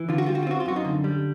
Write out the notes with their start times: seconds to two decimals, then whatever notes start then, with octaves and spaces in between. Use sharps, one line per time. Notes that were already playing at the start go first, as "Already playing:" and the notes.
Already playing: E3
0.09 D3 F4
0.18 F#4
0.26 G3 F4
0.35 F#4
0.43 F4
0.47 C4 F#4
0.60 F4
0.66 F#2 F#4
0.76 D#4 F4
0.85 D3
1.04 G3